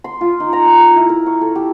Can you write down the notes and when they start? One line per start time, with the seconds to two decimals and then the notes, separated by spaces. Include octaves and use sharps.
0.04 C6
0.21 F4
0.40 D#4
0.53 A#5
0.66 B5
0.80 A#4
0.96 E4
1.09 A#4
1.26 C#6
1.41 A4
1.55 G4